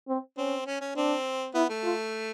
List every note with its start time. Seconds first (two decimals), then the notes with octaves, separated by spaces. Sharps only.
0.08 C4
0.37 C4 C#4
0.66 C#4
0.81 C#4
0.96 C4 D4
1.54 B3 E4
1.69 A3
1.83 F4